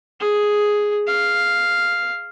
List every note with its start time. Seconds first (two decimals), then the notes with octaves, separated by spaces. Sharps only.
0.21 G#4
1.07 F5